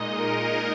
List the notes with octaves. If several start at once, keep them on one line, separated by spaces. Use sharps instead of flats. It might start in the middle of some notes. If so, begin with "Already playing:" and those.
Already playing: A#2 G#3 D#4 D#5
A#4